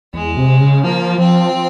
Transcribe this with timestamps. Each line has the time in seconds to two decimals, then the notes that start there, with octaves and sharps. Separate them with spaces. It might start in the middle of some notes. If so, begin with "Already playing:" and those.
0.14 E2 G#3
0.37 C3
0.60 C#3
0.83 F3 A#3
1.18 F3 C4
1.53 F3